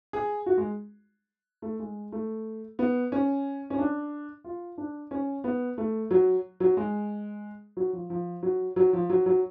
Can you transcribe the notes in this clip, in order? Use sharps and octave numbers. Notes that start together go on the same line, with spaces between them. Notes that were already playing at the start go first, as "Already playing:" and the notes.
G#4
F#4
G#3
A3
G#3
A3
B3
C#4
C#4
D4
F4
D4
C#4
B3
A3
F#3
F#3
G#3
F#3
F3
F3
F#3
F#3
F3
F#3
F#3